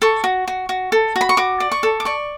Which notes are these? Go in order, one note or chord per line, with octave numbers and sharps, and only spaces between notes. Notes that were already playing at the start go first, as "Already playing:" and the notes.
A4 C#6
F#4
F#4
F#4
A4
F#4
B5
C#6
F#4 D6
D5
C#6
A4
D6
D5 C#6